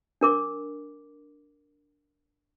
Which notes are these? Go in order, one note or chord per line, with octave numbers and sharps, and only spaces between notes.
D4 A#4 D6